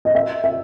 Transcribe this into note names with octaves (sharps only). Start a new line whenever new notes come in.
D#5
E5
E5